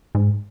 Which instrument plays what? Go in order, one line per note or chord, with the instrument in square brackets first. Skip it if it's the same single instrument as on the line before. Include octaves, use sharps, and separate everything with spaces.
[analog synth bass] G#2